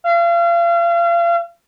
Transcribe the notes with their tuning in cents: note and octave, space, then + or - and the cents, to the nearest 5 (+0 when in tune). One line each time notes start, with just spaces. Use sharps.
F5 -35